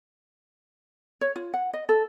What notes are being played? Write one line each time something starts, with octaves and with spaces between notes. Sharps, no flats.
C#5
F4
F#5
D#5
A4